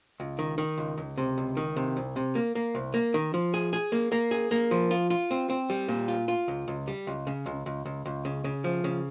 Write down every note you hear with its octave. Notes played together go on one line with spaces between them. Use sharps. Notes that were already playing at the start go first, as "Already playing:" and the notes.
C#2
D#3
D#3
C#2
C#2
C3
C#2
D#3
C3
C2
C3
A#3
A#3
C2
A#3
D#3
F3
G#4
G#4
A#3
A#3
G#4
A#3
F3
F4
F4
C4
C4
G3
A#2
F4
F4
C#2
C#2
G3
C#2
C#3
C#2
C#2
C#2
C#2
C#3
C#3
F3
C#3